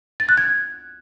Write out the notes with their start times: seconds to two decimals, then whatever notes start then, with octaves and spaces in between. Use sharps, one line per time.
0.20 A6
0.29 F#6
0.37 G#6